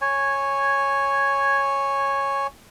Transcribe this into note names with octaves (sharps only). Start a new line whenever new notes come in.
C#5 G#5